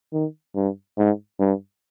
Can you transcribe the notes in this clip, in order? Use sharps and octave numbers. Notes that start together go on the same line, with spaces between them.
D#3
G2
G#2
G2